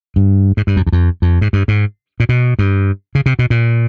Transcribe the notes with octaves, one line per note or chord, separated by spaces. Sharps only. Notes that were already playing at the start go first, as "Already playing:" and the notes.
G2
G#2
G2
F#2
E2
F2
F2
G#2
G2
G#2
A#2
B2
G2
C#3
C3
B2
A#2